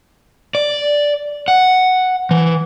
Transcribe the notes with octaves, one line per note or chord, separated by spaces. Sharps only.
D5
F#5
E3